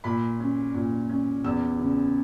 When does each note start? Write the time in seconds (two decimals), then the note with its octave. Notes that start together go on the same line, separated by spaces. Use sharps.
0.04 A#2 B5
0.40 C#4
0.75 A#2
1.09 C#4
1.44 E2 E6
1.79 C#3